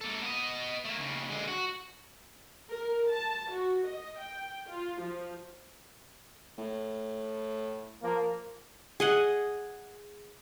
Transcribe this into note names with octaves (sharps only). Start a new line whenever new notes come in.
A#3 A4
B3 D#5
A3 A#3
D#2 C#3
D3 G#3
F#4
A#4
A5
F#4
D#5
G5
F4
F3
A2
F3 A#3
G#4 D#5 F#5